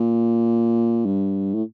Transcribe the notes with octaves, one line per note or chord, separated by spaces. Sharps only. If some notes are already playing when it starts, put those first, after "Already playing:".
Already playing: A#2
G2
A2